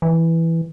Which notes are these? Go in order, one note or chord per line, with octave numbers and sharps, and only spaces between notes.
E3